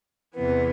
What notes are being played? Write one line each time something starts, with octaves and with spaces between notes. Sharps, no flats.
E2 C3 E3 B3